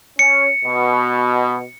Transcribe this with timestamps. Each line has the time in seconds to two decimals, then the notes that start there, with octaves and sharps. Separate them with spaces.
0.19 C#4 C#7
0.65 B2